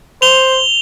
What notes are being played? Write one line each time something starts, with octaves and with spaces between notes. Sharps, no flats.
C5 F7 G7